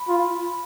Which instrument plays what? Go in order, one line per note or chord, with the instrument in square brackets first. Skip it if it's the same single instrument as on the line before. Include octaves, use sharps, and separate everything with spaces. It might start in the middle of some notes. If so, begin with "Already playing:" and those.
Already playing: [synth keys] B5
[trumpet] F4